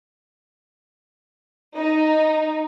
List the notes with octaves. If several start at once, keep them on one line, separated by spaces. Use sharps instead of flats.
D#4